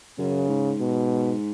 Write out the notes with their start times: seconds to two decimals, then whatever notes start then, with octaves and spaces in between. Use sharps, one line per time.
0.18 F#2 C#3
0.49 G#2
0.80 B2